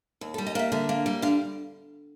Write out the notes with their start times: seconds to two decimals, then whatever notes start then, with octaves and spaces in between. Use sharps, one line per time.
0.21 D#2
0.34 A4
0.38 G3
0.47 D#5
0.55 A#3 E5
0.72 D3 E5
0.89 A#3
1.06 G3
1.22 D3 F5